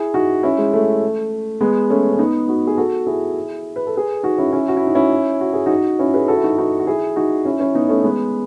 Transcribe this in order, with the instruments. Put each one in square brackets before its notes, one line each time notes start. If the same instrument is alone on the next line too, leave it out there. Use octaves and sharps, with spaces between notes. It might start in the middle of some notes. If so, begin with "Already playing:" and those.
Already playing: [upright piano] E4 G#4
D#4 F#4
C#4 E4
G#3
A3
G#3 B3
A3 C#4
C#4
B3 D#4
D#4 F#4
G#4
F#4 A4
E4 G#4
B4
A4
G#4 B4
D#4 F#4
C#4 E4
C#4 E4
F#4
E4
D#4
C#4 E4
F#4
G#4
D#4 F#4
C#4 E4
G#4 B4
F#4 A4
E4
D#4 F#4
D#4 F#4
F#4
E4 G#4
D#4 F#4
C#4 E4
C#4 E4
B3 D#4
A3 C#4
G#3 B3